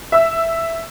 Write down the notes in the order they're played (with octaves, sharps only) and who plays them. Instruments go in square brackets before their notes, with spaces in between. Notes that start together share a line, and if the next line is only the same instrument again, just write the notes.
[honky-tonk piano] E5 E6